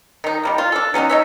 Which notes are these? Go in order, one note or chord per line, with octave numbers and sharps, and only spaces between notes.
D#3 D#4
D#3 G3 A#3
F4
D4 A4
F#3 C#4 D#4 F#4
D#4 C#5 E5